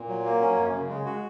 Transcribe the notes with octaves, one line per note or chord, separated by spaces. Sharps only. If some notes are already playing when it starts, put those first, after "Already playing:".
Already playing: A#2
F#3
A#3
C#4
F#2
C#3
G#3
F#4